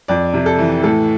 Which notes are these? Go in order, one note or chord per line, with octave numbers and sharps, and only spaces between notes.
F2 D5
C3
A4
E3
A2 A4